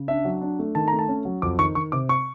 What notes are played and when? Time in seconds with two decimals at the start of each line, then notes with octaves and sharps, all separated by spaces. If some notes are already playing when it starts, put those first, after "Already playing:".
Already playing: C#3
0.08 D4 E5
0.25 F#3
0.41 D4
0.59 A3
0.75 D#3 A5
0.88 A#5
0.93 A3
0.99 A5
1.08 C#4
1.25 F#3
1.42 F2 D6
1.59 D#3 C#6
1.75 D#3 C#6
1.92 C3 D6
2.09 C#6